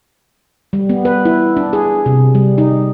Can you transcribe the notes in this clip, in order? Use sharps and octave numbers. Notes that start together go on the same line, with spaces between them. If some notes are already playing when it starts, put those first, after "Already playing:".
G3
B3
B4
E4
D4
G#4
C3
G3
D#4